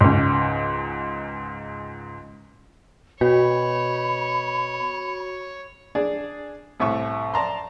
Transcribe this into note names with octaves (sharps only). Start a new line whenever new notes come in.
C#2 G#2
B2 F#4 C#5 B5
D4 G#4 D5
C2 A2 E5 C#6
D5 A5 A#5 C6